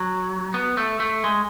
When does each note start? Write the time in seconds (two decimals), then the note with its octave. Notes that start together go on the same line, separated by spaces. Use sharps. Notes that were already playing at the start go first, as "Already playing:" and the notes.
Already playing: F#3
0.54 B3
0.77 A3
1.00 A3
1.24 G#3